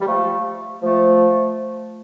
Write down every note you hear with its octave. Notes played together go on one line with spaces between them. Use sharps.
G3
F3 A3
F3 A3